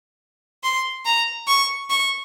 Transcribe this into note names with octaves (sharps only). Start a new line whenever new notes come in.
C6
A#5
C#6
C#6